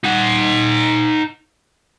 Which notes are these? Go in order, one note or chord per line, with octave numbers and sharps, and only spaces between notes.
D#4 F#5